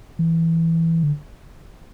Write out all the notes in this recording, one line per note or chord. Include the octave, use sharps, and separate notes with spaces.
E3
D3